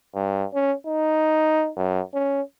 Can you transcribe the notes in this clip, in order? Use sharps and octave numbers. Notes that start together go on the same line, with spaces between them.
G2
C#4
D#4
F#2
C#4